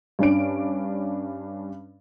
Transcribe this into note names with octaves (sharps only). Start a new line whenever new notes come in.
G2 C#4 D4 D7